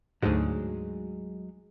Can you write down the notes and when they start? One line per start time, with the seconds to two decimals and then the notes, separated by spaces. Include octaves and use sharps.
0.22 D2 G#2 F#3 G#3 G#4